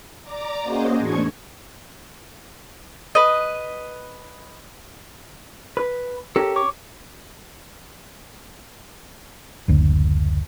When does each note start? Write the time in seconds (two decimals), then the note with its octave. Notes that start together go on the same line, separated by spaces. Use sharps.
0.22 D5 A#5 D6
0.63 A#3 C#4 F#4 G#4 C5 D#5
0.98 E2 A2 D4 C#6 G#6
3.15 B4 D#5
5.77 B4
6.36 C#4 G4 A4 A#4
6.56 C#5 C#6 D6
9.68 F#1 D2